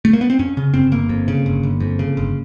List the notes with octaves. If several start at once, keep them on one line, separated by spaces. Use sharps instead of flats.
A3
A#3
B3
C4
F2 C#4
C#3
G1 C4
G1 A#3
F2
C#3
G1
G1
F2
C#3
G1